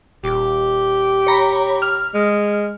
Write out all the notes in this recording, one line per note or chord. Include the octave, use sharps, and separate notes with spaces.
D#1 G4
C#5 A#5 B5
F6
G#3